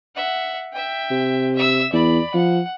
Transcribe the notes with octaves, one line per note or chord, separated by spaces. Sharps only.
E5 F#5
E5 G5
C3
E5 E6
E2 D5 B5
F3 F#5